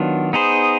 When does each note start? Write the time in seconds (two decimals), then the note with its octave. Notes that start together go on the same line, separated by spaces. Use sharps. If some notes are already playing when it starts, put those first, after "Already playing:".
Already playing: D#3 F#3 B3 D4 F4
0.33 B3 D#4 G#4 C5